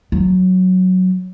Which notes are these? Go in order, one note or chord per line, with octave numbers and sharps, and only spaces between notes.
F#3